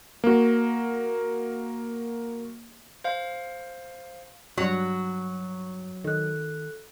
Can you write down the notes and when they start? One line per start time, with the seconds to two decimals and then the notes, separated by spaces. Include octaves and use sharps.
0.24 A#3 F#4
3.04 C5 F5
4.58 G2 F#3 C#6
6.04 D#3 A4 F#6